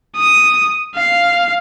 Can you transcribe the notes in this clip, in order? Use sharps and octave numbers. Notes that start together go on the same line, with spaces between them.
D#6
F5